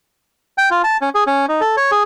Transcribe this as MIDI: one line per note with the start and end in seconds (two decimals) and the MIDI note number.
0.58 0.70 79
0.71 0.82 65
0.84 0.97 81
1.01 1.09 61
1.15 1.24 68
1.27 1.46 61
1.49 1.61 63
1.61 1.76 69
1.77 1.91 73
1.91 2.03 68